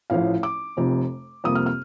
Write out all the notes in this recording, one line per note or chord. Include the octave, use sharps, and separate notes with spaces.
A1 A2 F3 F5
D6
F1 F2 C3
F2 C3 G3 A#3 D#6
F6
F6